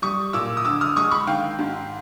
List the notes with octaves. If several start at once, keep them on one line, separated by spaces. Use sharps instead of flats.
G3 C#6 D#6
A#2 D6 E6
D#6
D3 D6 E6
D#6 F6
G#3 C#6 D#6
B5 C#6
D#3 F5 G5
G#2